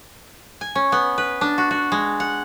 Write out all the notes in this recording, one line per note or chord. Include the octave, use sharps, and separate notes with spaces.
G#5
C#4
B3
B4
D4
F#4
F#4
G#3
F#5